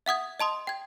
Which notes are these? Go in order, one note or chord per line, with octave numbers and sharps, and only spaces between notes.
E5 F#5 D#6 G#6
D#5 A5 C6 D#6
G5 G#6